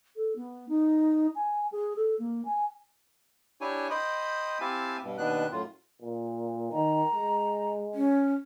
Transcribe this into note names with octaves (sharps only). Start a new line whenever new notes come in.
A4
B3
D#4
G#5
G#4
A4
A#3
G#5
D4 E4 G4 C#5 G#5
C5 D#5 G5 B5 D#6
C4 E4 G4 F5 G#5 A5
G2 B2
D#2 B2 D#3 B3 D4 F#6
F#2 A2 F4
A#2
D#3 A#5
G#3
C#4